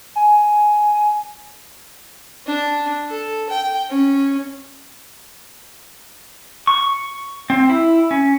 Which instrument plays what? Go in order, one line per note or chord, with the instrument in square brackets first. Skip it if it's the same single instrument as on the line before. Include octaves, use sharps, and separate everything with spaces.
[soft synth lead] G#5
[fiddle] D4
A4
G5
C#4
[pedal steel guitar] C#6
C4
E4
C#4